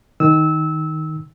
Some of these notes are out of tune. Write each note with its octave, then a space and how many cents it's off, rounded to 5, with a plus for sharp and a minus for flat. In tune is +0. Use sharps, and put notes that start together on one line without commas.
D#3 +10 E6 -20